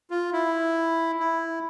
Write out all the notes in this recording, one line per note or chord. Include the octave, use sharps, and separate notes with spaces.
F4
E4
E4